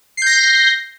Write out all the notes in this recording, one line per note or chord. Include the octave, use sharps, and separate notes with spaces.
G6 A#6 C7